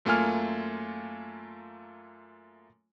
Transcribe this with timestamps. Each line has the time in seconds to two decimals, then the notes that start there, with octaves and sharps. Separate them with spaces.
0.05 F#2 A3 A#3 F4 G#5 F6